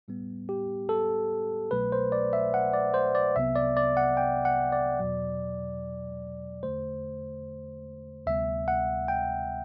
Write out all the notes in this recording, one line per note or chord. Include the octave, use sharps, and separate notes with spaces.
A2 G3 B3
G4
A4
C2 B2 F#3 A3 B4
C5
D5
E5
F#5
D5
C5
D5
C2 C3 F#3 B3 E5
D5
D5
F#5
G5
F#5
D5
E2 B2 F#3
E2 D3 A3 C5
D2 C3 G3 B3 E5
F#5
G5